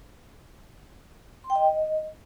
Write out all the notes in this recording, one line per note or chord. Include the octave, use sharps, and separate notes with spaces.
C6
G5
D#5